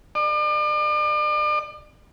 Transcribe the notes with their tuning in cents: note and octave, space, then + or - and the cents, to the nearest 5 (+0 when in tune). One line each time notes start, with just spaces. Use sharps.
D5 +40